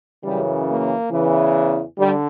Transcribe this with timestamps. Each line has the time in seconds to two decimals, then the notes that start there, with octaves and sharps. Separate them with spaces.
0.24 F#2 C#3 E3 G3
0.68 A#3
1.11 E2 C#3 E3
1.98 D3 G3